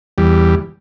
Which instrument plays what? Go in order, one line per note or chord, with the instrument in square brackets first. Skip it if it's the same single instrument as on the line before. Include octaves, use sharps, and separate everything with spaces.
[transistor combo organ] E2 G3